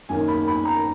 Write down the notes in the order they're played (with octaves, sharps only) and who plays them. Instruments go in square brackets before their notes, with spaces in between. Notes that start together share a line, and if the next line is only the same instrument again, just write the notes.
[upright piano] F#2 D#3 A#3 G#5
B5
B5
A#5